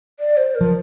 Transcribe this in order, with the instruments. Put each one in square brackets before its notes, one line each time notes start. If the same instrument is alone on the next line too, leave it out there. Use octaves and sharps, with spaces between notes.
[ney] D5
C5
A#4
[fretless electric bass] F3